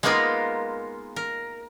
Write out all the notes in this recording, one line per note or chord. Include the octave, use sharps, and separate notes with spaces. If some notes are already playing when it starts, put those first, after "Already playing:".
G#3 A#3 B3 D#4 F4 A#4
A#4